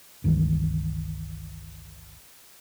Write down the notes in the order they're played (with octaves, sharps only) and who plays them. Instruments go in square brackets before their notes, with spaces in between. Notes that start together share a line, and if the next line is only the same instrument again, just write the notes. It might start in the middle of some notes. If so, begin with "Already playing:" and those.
[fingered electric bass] G1 C#2 D#3 E3